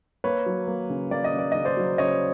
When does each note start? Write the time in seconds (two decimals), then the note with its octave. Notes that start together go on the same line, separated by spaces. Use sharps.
0.24 A#3 B4 C#5
0.46 F#3
0.68 A#3
0.90 C#3
1.11 A#3 D5
1.24 D#5
1.34 C#3
1.39 D5
1.52 C#3 D#5
1.65 C5 D5
1.77 F#3
1.98 C#3 C#5 D#5